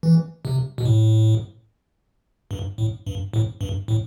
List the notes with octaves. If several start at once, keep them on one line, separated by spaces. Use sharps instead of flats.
E3
C3
B2
A2
G2
A2
G2
A2
G2
A2